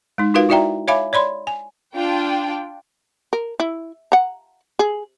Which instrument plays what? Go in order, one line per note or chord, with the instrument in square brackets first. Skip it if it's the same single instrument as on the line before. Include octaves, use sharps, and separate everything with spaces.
[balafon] G#3 D#4
D#4 F4 F#4 A#4 B4 F5
E4 F#4 D5 E5 G5 A#5
C#5 E5 F5 G#5 B5 D6
C#5 D5 B5 C6
G#5
[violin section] D4 F4 G5
[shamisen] A#4
E4
F#5 A#5
G#4